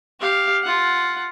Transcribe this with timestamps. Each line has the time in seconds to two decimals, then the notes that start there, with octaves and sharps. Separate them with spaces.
0.20 G4 F5
0.64 F4 F#5